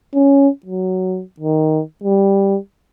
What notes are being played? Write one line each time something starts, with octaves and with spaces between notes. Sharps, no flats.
C#4
F#3
D#3
G3